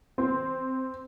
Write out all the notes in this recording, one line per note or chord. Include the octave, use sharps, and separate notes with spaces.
C4